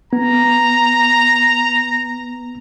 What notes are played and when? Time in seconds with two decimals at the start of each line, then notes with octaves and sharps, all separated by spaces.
0.13 B3 A#5